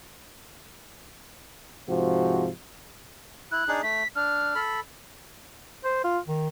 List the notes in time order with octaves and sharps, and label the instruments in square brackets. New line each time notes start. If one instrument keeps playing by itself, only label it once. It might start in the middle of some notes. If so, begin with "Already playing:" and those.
[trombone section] G#2 C3 F3 F#4
[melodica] E4 [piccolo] F#6
[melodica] D4 D#4 G#4
[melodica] A3 [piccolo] B6
[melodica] D4 [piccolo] F6
[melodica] A4 B5
[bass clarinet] C5
F4
D#3